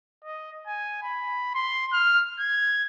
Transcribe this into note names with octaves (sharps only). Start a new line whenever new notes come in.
D#5
G#5
B5
C6
F6
G#6